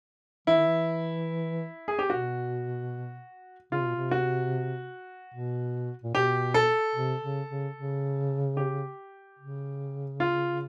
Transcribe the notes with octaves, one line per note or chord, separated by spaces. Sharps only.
E3 E4
D#3
E3
G#4
G4
B2 F#4
C#3 F4
C3
B2
C3
F#4
B2
A#2
B2 G4
A4
C3
C#3
C#3
C#3
G4
C#3
F4